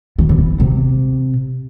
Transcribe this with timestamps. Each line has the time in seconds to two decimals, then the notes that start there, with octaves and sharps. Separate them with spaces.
0.19 E3
0.29 D3
0.38 E3
0.60 C3